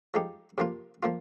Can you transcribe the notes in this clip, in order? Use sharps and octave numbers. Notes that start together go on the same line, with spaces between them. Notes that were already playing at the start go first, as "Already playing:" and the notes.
F3 G#3 D#4 G4
C3 F3 A#3 F4
F3 A#3 F4